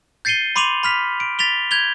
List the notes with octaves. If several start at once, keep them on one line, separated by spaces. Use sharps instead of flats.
G6 A6 C7 C#7 D#7 G7
B5 C6 D6 D#7 F7 F#7
B5 F6 B6
D7
A6 B6 F7 G7
G6 G#6 F7 G7